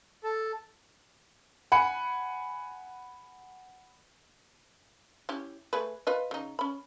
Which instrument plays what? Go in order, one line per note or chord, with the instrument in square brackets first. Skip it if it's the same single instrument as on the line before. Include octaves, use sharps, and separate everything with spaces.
[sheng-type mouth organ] A4
[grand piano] F#5 G#5 B5 C#7
[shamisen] C#4 E4 G4
A3 G#4 B4
F4 B4 D#5
C#3 D#4
C#4 B5